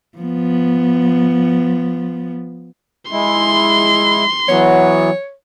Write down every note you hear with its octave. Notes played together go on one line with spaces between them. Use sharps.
F3 B3
G#3 E4 C6
E3 F#3 B3 C#5